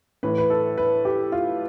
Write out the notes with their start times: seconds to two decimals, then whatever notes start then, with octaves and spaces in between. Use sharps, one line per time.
0.23 A2 E3 B4
0.38 B4
0.50 A4
0.78 B4
1.05 G4
1.32 F4